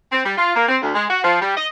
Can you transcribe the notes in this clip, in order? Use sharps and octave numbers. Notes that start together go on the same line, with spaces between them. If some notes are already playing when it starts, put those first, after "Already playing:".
C4
G3
F4
A#3
C4
D2
G#3
F#4
F3
G3
D#5